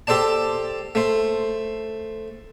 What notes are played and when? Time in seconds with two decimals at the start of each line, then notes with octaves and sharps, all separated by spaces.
0.07 G4 A4 C5 D5 A5
0.95 A3 C5